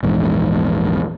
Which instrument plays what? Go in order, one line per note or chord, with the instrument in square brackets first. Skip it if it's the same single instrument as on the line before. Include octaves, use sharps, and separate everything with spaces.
[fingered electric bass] A#1 E2 G#2